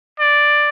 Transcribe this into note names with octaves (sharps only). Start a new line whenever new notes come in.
D5